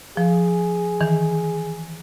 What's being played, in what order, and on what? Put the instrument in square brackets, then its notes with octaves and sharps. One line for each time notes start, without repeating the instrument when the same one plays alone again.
[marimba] F3 [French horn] G#4
[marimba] D#3 E3